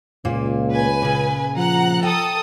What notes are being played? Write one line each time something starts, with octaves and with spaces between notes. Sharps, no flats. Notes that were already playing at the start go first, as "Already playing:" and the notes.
C#2 A#2 A#3
B4 G#5
A#2 C#3
F3 F#5 A#5 F#6
A4 G5 D#6